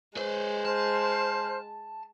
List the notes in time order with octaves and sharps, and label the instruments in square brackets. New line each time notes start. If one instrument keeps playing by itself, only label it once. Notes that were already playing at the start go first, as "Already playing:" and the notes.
[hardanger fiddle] G#3 [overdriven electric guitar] B4 C5
[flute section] C5 F6 [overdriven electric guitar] A5